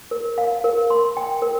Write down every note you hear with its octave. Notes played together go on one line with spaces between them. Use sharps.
A#4
F5
A#4
C6
G5
A#4